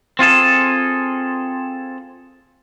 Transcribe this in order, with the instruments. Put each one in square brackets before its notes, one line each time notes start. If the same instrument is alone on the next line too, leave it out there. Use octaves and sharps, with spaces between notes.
[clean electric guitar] C4 F4 G#4 A4